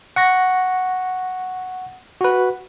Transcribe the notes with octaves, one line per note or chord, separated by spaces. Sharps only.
F#5 C#6 A#6
F#4 B4